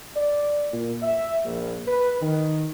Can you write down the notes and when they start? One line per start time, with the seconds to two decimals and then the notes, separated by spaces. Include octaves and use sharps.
0.16 D5
0.72 A#2
1.02 E5
1.44 A#1
1.87 B4
2.21 D#3